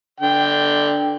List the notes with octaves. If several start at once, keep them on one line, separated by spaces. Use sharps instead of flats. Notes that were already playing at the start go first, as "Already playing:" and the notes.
D3 G5